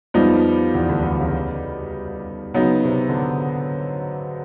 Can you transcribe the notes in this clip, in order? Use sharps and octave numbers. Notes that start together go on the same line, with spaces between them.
F2 F3 G3 B3 D#4
E2 E3
D2 D3
D2 D3
C#3
C#3 F#3 B3 D#4
C3
D3